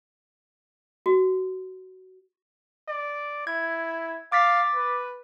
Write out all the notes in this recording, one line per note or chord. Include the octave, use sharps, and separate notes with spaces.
F#4
D5
E4 G#6
F5 D6 A6 B6
B4